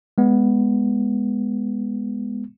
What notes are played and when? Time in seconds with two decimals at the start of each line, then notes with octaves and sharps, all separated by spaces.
0.18 G#3 B3